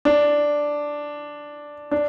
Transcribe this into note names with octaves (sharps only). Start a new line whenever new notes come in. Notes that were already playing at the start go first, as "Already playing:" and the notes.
D4
D4